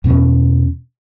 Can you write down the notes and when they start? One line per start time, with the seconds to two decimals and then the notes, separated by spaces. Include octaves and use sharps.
0.04 E2 B2 A3 C#4